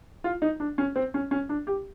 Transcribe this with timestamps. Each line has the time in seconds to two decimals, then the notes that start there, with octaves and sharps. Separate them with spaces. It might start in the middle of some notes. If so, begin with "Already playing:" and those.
0.24 F4
0.42 D#4
0.60 D4
0.78 C#4
0.96 C4
1.14 C#4
1.31 C#4
1.49 D4
1.67 G4